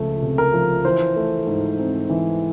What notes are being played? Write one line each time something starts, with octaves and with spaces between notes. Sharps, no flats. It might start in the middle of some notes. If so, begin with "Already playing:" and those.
Already playing: C#2 F3 A3
C3
A#4
F3
E3 C5
A3
G#2
C4
E3